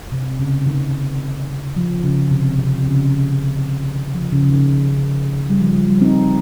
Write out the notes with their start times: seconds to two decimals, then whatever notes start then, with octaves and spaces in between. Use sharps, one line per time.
0.12 C3
0.40 C#3
0.66 D#3
1.76 F3
2.04 C#3
2.31 C3
2.59 C3
2.86 C#3
3.96 D#3
4.14 F3
4.32 C#3
4.42 C#3
4.50 D#3
5.50 G3
5.60 F3
5.74 G3
5.88 G3
6.01 C4 D#4